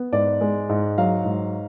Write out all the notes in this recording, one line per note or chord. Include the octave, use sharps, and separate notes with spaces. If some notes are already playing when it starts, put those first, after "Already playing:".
Already playing: B3
G#2 D5
G#3
G#2
F#3 F5
G#2